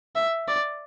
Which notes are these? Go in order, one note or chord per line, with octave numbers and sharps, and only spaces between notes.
E5
D5